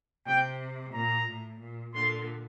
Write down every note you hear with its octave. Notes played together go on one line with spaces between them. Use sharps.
C3 G5
A#2 A#5
A2
A#2
A#2 D3 C6